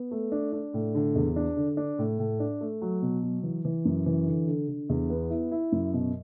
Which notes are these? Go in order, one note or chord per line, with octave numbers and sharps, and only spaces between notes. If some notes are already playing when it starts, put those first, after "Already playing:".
Already playing: B3
A3
D4
D4
A2
D3
E2
D4
D3
D4
A2
A2
D4
A3
F#3
B2
F#3
E3
E3
F#2
E3
D3
D3
D3
E2
B3
E4
E4
F#2
B2